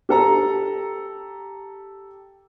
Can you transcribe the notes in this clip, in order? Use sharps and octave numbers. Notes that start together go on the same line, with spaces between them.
G4 A4 A#5